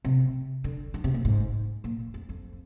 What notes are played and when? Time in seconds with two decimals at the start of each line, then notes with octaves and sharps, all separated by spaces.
0.05 C3
0.64 D3
0.94 D#3
1.04 C3
1.14 A#2
1.25 G#2
1.84 A#2
2.14 F2
2.29 F2